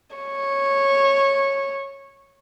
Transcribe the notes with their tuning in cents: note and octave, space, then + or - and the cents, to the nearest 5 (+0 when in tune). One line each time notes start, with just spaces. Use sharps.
C#5 -10